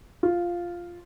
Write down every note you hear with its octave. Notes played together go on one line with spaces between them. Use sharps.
F4